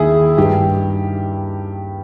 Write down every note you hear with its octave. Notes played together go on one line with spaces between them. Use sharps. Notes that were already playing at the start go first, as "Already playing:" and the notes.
Already playing: D#2 D#3 E4 G#4
G2 D#3 G4